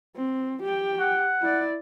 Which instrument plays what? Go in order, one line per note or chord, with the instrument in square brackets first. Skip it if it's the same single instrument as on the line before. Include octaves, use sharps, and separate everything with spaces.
[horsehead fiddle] C4
G4 G5
[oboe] F#5
[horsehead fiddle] E4 D5